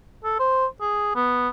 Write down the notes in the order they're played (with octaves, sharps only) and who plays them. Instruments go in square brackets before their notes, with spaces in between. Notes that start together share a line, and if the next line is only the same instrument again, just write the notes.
[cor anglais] A4
C5
G#4
B3